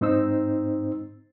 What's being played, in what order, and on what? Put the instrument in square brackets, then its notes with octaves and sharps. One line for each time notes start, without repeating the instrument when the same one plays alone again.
[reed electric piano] G#2 C4 D#4 C5 E6